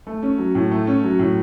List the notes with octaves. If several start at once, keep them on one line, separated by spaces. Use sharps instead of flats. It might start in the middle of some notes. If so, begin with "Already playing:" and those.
A3
C#4
F#3
A2
A3
C#4
F#3
A2